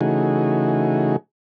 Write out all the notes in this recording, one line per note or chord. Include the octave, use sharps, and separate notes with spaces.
C#3 E3 A3 D#4 F#4 G#4